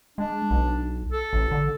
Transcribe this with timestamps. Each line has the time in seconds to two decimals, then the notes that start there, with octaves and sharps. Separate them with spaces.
0.18 G#3 D4
0.51 B1
1.12 A4
1.33 A1
1.51 D3